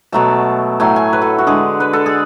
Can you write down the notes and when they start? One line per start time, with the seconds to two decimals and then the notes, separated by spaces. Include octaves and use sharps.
0.12 B2 F#3 A3 A5
0.80 A2 F#3 A3 G#5
0.96 G#5
1.13 B4
1.22 A4
1.38 F#4
1.47 D3 G#3 G#4
1.80 B4
1.93 A4
2.06 G#4